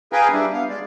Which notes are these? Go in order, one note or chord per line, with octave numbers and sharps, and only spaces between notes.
G#4 B4 F5 G5 G#5 A#5
G3 D4 E4
B3 F5
G#3 D5